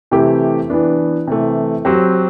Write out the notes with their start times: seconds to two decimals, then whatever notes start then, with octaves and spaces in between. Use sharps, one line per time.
0.11 C3 E3 A3 E4 G4
0.70 E3 B3 D4
1.27 C3 E3 A3
1.85 F#3 C4 G4